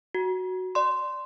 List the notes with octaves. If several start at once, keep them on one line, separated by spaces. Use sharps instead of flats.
F#4
D5 C6